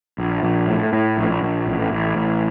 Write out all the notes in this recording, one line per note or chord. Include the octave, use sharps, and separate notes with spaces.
A#1
A#1
A2
A2
A#1
A#1
A1
A1
A1